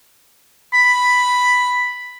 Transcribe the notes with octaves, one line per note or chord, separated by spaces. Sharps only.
B5